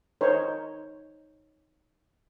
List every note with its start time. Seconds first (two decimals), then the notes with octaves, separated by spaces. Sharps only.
0.21 D#4 A#4 C5 C#5